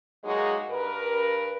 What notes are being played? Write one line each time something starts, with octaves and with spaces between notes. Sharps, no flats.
F#3 G#3 A#3 D#4 F#4 G#4
G2 A#4 B4